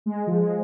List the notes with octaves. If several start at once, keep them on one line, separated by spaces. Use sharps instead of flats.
G#3
F3
G#3